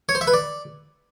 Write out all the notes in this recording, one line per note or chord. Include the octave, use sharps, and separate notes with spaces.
C#5
C5
E5
B4
D5